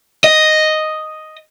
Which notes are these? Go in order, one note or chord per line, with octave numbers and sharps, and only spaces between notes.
D#5